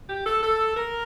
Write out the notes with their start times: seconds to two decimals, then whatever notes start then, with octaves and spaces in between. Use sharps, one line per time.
0.09 G4
0.26 A4
0.43 A4
0.77 A#4